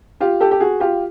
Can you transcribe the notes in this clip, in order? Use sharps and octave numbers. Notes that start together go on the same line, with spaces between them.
F4 G4
G4 A4
G4
F#4 G#4
F4 G4